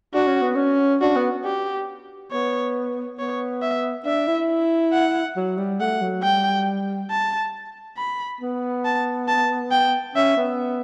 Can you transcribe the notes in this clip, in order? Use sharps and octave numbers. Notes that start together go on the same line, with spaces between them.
D4 F#4
C#4
B3
C#4
D4 F#4
B3
G4
B3 C#5
B3 C#5
E5
D4 E5
E4
F#5
F#3
G3
A3 F#5
F#3
G3 G5
A5
B5
B3
A5
A5
G5
C#4 E5
B3